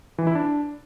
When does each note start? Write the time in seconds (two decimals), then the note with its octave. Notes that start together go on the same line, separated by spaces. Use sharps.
0.18 E3
0.27 E4
0.35 D4